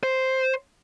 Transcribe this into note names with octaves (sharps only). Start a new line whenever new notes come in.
C5